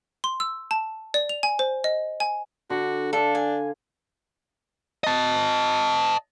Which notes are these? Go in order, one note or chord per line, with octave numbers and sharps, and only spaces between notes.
C6
E6
A5
D5
F7
G#5
C5
D#5
G#5
D3 F#4
D4 A4 F5
G#5
D#5 A5